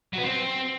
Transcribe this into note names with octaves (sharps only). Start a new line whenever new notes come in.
F#3
B3
C4